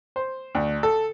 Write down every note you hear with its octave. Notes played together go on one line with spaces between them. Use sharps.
C5
D2
A4